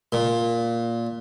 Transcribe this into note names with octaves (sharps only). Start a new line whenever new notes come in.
A#2